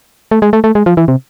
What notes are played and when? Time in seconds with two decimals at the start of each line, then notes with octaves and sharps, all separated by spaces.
0.31 A3
0.42 G#3
0.53 A3
0.64 A3
0.75 G#3
0.86 F3
0.97 E3
1.08 C3